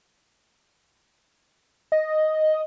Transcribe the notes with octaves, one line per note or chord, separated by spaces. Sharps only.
D#5